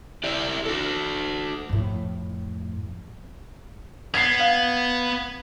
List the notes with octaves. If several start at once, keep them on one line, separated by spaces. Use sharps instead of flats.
E4 G4 D5
F#4 A4
F2 A2
B3 G#6 C7
F5